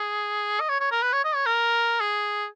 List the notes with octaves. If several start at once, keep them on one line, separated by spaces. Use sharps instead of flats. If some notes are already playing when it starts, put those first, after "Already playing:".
Already playing: G#4
D#5
C#5
C#5
A#4
B4
C#5
D#5
C#5
A#4
G#4